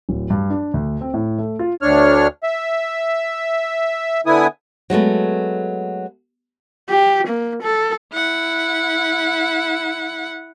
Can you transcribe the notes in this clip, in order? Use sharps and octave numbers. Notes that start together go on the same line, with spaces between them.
D1
G2
D4
D2
C4
A2
A3
F4
D2 D4 C#5 F6
E5
D3 B3 E4 G#5 D#6
F#3 G#3 A3 B3
G4
A#3
A4
E4 F#5